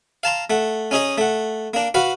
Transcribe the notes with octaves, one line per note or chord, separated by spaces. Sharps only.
F5 A5 A#5 C6
A3 F#5
C#4 D#4 G#4 D#5
A3 F#5
A#3 D4
F#4 B4 F5 F#5